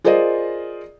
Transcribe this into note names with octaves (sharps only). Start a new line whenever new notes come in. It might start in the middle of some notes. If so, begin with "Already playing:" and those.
F4 G#4 A#4 C5 D5 D#5